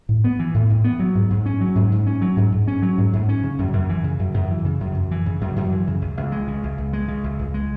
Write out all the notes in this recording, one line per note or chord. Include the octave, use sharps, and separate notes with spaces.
A2
B3
E3
A2
A2
B3
F#3
G#2
G#2
C#4
F#3
G#2
G#2
C#4
F#3
G#2
G#2
C#4
F#3
G#2
G#2
C#4
C#3
F#2
F#2
E3
C#3
F#2
F#2
E3
C#3
F#2
F#2
E3
C#3
F#2
F#2
E3
C#3
C#2
C#2
G#3
C#3
C#2
C#2
G#3
C#3
C#2
C#2
G#3